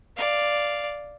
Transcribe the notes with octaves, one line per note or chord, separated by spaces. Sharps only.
D5 F5